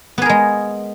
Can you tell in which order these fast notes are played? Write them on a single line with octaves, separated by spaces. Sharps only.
B3 G#4 A#4 G#3